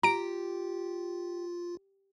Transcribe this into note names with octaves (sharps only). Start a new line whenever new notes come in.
F4 G4 A#5 D7